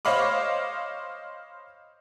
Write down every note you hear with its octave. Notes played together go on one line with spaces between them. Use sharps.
C5 C#5 D#5 F5 B5 D6